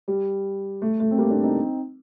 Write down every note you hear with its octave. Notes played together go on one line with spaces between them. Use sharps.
G3
A3
A3
C4
G3 A#3
A#3 D4
C4 D#4